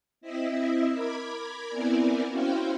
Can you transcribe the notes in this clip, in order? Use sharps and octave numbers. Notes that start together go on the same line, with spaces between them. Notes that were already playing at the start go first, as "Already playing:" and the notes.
C4 E4 D#5 E5
A#4 B5 D6 G#6
B3 C4 E4 A#4 D5 G#5
C#4 E4 F#4 C5 F5 G5